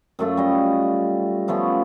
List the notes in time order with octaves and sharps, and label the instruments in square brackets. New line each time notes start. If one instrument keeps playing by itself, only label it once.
[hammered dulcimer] F#2 A3 F4
G3 D#5
F3 A3 B3 C#4